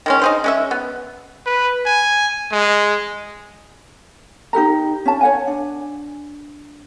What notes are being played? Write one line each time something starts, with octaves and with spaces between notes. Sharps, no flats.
D#3 G#3 C#4
D#4 G#4 C5
G#3 C#4 E5
B3
B4
G#5
G#3
D#4 G4 A4 A#5
C#4 A5
C#5 F#5 G#5
D4